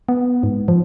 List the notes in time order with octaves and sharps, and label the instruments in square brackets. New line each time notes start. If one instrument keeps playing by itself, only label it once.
[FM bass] B3
G#2
F3